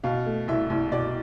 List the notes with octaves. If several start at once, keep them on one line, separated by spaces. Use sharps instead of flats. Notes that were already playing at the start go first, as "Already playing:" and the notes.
B2 F5
A3
C2 E5
C2
B2 D5